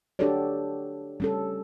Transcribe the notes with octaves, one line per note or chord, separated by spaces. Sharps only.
D4 F#4 G4 A4 C#5 D5
G3 C#4 A4